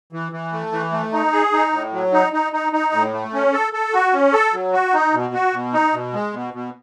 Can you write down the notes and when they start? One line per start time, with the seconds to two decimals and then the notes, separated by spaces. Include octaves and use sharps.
0.13 E3
0.32 E3
0.52 A3
0.72 E3
0.92 A3
1.13 D#4
1.32 G#4
1.53 D#4
1.73 A2
1.93 F#3
2.13 D#4
2.33 D#4
2.53 D#4
2.73 D#4
2.93 A2
3.13 A3
3.33 C#4
3.53 A4
3.73 A4
3.93 F#4
4.13 C#4
4.33 A4
4.53 F#3
4.73 F#4
4.94 D#4
5.14 B2
5.34 F#4
5.54 B2
5.74 D#4
5.93 B2
6.13 G#3
6.34 B2
6.54 B2